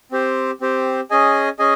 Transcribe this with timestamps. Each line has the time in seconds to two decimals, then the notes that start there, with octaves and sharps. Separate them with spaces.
0.12 C4 G4 C5
0.61 C4 G4 C5
1.10 C#4 G#4 D#5 G#5
1.59 C#4 G#4 D#5 G#5